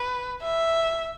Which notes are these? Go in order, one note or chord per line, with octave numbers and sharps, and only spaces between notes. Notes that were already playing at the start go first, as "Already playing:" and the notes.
Already playing: B4
E5